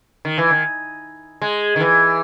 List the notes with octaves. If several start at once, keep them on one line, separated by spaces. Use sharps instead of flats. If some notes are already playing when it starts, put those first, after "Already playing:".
D#3
E3
D#3
G#3
D#3
E3